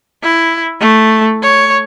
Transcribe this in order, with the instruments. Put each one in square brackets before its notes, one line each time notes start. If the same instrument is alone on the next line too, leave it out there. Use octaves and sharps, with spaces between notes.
[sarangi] E4
A3
C#5